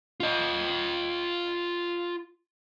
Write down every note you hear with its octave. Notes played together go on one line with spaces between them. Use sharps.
F4 D#5